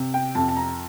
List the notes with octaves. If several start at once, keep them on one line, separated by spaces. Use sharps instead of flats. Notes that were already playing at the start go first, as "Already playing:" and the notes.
Already playing: C3
G5
F2 A5
A5
A#5